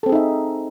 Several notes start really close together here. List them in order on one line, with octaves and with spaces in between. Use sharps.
A4 C4 G#4 D#4 E5